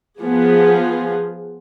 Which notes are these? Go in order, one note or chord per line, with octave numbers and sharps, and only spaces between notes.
F3 B3 F4 G#4